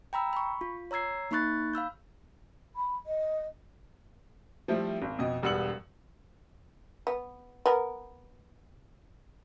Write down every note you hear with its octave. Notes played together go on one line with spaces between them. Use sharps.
G5 A#5 B5 E6
B5 C#6
F4
C#5 A#5 E6 G#6 C7
A#3 D#4 B5 C#6 F#6 A6
F5 B5 E6 G6
B5
D#5
F3 G3 A3 C4 E4
G#1
F2 B2 D#5
E1 G2 B3 E6 C#7 F#7
B3
B3 A#4